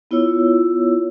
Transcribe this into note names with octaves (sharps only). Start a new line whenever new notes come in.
B3 E4 F4 C#5 E6